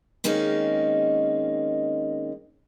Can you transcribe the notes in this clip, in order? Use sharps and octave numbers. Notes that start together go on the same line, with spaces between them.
D#3 G#3 A#3 C4 C#4 D#4